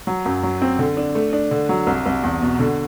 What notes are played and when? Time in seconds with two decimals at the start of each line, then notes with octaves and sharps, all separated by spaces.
0.07 F#3
0.25 F#2
0.43 F#3
0.62 C4
0.79 D3
0.97 D4
1.15 A3
1.33 D4
1.51 D3
1.69 F#3
1.87 C2
2.06 C2
2.23 E2
2.42 B2
2.59 D3